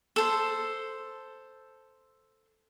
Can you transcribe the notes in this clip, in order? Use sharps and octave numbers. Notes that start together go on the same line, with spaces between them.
A4 C5